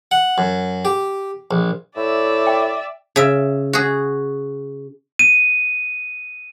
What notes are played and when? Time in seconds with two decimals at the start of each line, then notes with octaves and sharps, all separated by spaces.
0.11 F#5
0.38 F#2
0.85 G4
1.51 A#1
1.96 A2 D5 E5
2.47 G5
3.16 C#3 E5
3.73 F#4 G#4
5.19 D#7